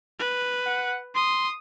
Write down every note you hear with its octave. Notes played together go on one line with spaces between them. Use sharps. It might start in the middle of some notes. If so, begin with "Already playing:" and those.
B4
F#5
C6 D#6